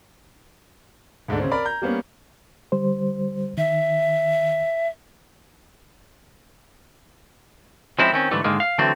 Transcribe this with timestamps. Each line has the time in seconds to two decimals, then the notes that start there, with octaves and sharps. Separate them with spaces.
1.28 D2 G#2 A3 D4
1.40 C#3 C4 C#4
1.51 A#4 D5 B5
1.65 A#5 G6
1.82 G3 A#3 B3 C#4
2.72 D3 G3 C5
3.58 D#3 E5
7.99 F3 G#3 C4 C#4 E4
8.12 D#3 C4 C#4
8.31 G#2 D3 E3 G3 A3
8.44 G#2 D3 D#3 G#3 A#3
8.60 F5
8.78 D3 E3 F#3 A3 C4